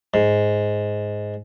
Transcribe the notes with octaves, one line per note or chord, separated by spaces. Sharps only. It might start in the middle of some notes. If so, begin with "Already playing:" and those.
G#2